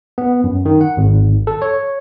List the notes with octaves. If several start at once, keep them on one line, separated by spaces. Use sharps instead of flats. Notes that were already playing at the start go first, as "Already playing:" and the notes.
B3
F#2
D#3
F#5
G#1
A4
C#5